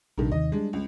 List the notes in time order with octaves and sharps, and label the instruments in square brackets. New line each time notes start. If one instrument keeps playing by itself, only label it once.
[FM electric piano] A#1 C3 [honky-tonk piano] G2 D#3
[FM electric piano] D#2 C3 D#3 [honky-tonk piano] D#5
[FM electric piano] G3 [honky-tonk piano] G#3 D4
[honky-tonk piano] C#2